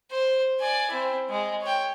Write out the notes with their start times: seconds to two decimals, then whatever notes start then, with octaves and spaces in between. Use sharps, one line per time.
0.11 C5
0.60 D5 G#5
0.90 C4 E4
1.30 G#3
1.62 C#5 G5